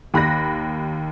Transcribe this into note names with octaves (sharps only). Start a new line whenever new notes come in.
D#2 B5 F#6 A#6